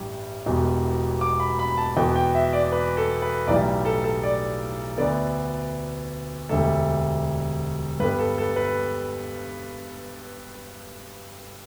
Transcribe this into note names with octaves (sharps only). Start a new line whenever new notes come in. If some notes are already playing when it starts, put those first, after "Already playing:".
Already playing: A1 G2 G3
E1 E2 B2 G3
D6
B5
B5
A5
E2 B2 B3 G5
G5
E5
D5
B4
A4
B4
B1 A2 E3 G3 D5
A4
A4
D5
D2 D3 B3 D5
E1 D2 D3 G3 A4
G2 G3 B3 B4
A4
A4
B4